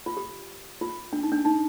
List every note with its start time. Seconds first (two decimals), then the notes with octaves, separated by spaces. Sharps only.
0.06 F4
0.17 G4
0.81 F4
1.13 D4
1.23 D#4
1.32 D4
1.45 D#4